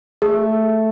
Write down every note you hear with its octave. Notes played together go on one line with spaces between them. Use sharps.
A3 G#4